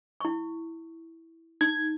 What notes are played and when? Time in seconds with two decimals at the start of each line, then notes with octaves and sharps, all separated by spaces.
0.21 E4 C#6
1.61 D#4 G#6